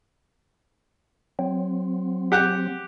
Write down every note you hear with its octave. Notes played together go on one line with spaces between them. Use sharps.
F#3 C4
G4 F#5